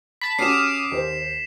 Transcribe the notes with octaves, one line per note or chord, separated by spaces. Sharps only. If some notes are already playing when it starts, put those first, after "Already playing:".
A5 B5 B6
C#4 F#4 G4 D6 D#6 F6 C7 E7
D#2 G4 C5